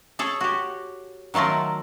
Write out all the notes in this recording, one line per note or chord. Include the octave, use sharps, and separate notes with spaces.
G#4 A4 C#5
F#4 G4
D#3 F#3 A3 F4 A#4